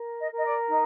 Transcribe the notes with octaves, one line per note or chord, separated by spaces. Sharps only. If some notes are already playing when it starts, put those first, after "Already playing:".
Already playing: A#4
D#5
A#4 D#5
D5
D#4 D#5